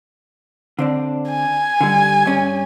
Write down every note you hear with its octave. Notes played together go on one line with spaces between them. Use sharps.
D3 C4 D4
G#5
D3 G3
G2 C#4